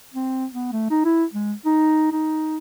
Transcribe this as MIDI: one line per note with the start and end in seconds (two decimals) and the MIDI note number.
0.14 0.46 60
0.52 0.72 59
0.72 0.86 57
0.90 1.02 63
1.05 1.24 64
1.33 1.53 56
1.66 2.08 63
2.12 2.58 63